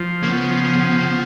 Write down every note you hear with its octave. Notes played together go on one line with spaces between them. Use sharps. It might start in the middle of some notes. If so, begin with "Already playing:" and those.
Already playing: F3
C#3 A#3
B3
F3
C#3
C#3